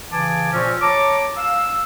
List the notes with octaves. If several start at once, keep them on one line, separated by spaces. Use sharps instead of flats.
C#3 E3 G#5 A5 D6
A#2 F3 C4 C#4
C#5 A5 A#5 D6
F5 E6